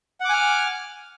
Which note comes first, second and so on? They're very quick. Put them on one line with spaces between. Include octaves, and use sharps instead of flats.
F#5 D6 G#5 F6